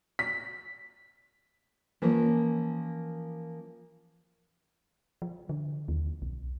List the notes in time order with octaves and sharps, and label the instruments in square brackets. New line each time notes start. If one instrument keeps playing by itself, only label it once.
[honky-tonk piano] B6
[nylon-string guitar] E3 F3 A#3 C#4 A#4 C#5
[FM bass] F3
D3
D#2
B1